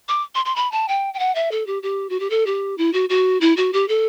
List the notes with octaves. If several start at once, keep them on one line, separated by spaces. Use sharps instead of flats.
D6
C6
C6
B5
A5
G5
G5
F#5
E5
A4
G4
G4
F#4
G4
A4
G4
E4
F#4
F#4
E4
F#4
G4
A4